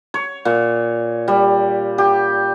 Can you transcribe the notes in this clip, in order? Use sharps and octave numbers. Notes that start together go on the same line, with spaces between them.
C#5
A#2
G3
G4